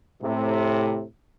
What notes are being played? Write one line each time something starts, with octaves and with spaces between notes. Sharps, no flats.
A2 C3